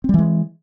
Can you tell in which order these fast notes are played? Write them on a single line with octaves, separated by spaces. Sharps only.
C4 G3 E3 G#3